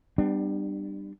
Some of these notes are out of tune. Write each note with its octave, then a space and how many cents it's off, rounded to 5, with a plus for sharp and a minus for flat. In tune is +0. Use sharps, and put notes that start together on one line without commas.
G3 +0 B3 +30 D4 +30